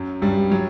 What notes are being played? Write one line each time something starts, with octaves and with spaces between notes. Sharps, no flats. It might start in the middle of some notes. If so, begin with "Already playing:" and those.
Already playing: F#2 F#3
G2 G3
F#3